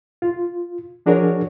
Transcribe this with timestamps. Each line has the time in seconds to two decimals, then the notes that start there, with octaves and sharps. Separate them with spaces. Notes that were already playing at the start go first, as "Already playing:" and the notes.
0.22 F4
1.06 F3 D4 F#4 G#4 A#4 C#5